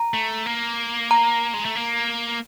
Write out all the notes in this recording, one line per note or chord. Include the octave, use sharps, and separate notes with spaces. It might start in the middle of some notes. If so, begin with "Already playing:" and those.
Already playing: A#5
A3
A#3
A#5
G#3
A3
A#3